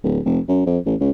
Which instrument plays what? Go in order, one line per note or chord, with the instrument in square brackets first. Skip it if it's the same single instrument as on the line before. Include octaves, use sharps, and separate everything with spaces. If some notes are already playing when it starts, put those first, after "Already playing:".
[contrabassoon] D1
F1
F#2
F2
A1
C#2